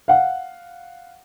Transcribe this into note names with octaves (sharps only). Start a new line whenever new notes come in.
F5 F#5